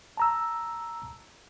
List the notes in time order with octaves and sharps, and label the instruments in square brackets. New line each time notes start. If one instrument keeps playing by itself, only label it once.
[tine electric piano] A5 A#5 E6